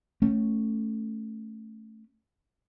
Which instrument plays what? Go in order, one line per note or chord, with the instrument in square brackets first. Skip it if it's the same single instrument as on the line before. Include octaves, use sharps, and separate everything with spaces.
[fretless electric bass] A3 C#4